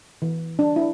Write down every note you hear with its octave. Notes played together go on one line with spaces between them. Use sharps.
E3
D4
E4